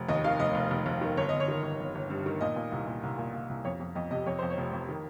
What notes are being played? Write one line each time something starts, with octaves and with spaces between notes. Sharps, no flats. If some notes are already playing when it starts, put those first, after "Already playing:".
Already playing: F1
D#2 D#5
D#3 F5
F1 D#5
F1
F1
F1
D#3
G1 C#5
G1 D#5
C#5
D#3
G1
G1
G1
G2
D#3
A#2 D#5
A#2
C2
A#2
C2
A#2
A#2
C2
F2 C#5
F2
F2 D#5
C3 D#5
F2 C#5
F2 C5
C#5
F1
F2
D#3